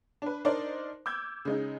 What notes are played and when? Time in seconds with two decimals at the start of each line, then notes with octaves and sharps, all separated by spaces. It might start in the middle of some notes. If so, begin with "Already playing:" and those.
0.22 D4 B4
0.45 D4 D#4 A#4 C5 D5
1.06 D6 E6 G6 G#6
1.45 C#3 G#3 D#4